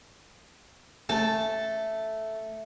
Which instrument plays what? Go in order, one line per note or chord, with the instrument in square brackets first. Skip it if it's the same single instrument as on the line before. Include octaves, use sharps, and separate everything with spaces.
[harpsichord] A3 [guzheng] A5